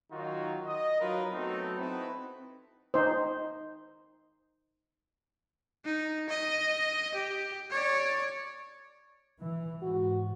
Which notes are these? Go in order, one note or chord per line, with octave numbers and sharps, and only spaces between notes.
D#3 F#3 D#4 F4 F#4
D#5
F#3 D#4 F4 A#4 B4 D#5
F#3 A3 B3 C4 D#4
C4 D#4 E4 F#4 A4 B4
D#4 C5
D#4
D#5
G4
C#5 D5
E3
G#2 F#4